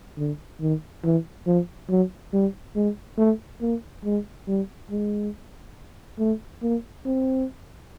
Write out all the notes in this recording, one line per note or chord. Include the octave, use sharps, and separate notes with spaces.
D3
D#3
E3
F3
F#3
G3
G#3
A3
A#3
G#3
G3
G#3
A3
A#3
C4